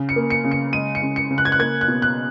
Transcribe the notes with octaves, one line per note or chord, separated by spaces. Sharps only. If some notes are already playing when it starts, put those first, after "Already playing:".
Already playing: C#3
C#7
A#3
C#7
C#3
C#7
G#3 D#7
C#7
C#3
C#7
C#3
F#6
G#6
F#6
A#3 G#6
F#6
B2
F#6